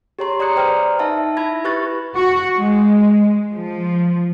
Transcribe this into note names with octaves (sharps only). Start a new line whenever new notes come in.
G4 G#4 C#5 A#5 C6
D5 A#5 D#6 F#6 C#7
B4 C5 D5 G5 A#5 F6
D#4 E5 A5
E4 E5 B5 G#6 A#6
G4 B4 C#6 F#6 A6
F#4
G#3
F3